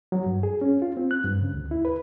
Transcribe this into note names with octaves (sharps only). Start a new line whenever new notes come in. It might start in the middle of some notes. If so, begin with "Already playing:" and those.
F#3
G2
G#4
C#4
F4
C4
F#6
G2
C#3
D2
E4
B4